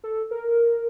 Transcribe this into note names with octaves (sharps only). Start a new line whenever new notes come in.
A4
A#4